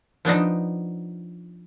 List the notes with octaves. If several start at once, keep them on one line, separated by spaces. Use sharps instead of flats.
F3 B3 D4 D#4